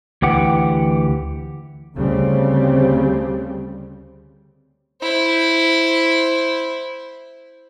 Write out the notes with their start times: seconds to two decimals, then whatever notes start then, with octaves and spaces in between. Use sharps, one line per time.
0.22 D2 E3 G4 F#5
1.97 D2 C#3 G3 C4
5.02 E4 C5